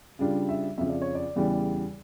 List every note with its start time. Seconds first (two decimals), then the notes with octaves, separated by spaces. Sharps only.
0.19 C#3 G3 D4 F4
0.49 E5
0.78 F2 C#3 F3 E5
0.89 D5
1.02 C#5
1.15 D5
1.36 E2 C#3 E3 G3